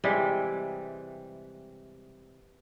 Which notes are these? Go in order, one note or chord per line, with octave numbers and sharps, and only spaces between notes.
C3 E3 G3 G#3